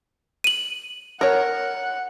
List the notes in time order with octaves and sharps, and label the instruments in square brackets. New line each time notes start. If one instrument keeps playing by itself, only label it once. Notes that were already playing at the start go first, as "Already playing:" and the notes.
[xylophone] D#7 F#7
[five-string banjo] A#4 C#5 [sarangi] F#5